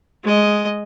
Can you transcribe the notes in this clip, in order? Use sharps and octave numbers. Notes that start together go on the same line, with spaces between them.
G#3 D#5